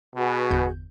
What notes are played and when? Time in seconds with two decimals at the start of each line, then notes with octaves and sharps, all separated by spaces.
0.15 B2 F#4 G#4 B4
0.51 G1 E2 G6